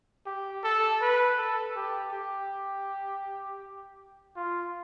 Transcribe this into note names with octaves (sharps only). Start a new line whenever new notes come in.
G4
A4
B4
A4
G4
G4
F4